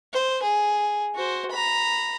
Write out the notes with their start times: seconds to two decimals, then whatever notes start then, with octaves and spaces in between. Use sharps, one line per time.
0.13 C5
0.43 G#4
1.15 F#4 C5
1.51 A#5 B5